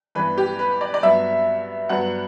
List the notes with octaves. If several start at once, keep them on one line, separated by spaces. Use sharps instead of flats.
G2 E3 B3 B4
G4
B4
D5
D5
G2 F#3 B3 E5
G2 F#3 B3 F#5